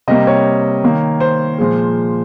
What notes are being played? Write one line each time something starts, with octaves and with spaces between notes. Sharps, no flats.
C3 G3 A#3 D#5
C#5
D#3 A#3
C5
A#2 F3 G#3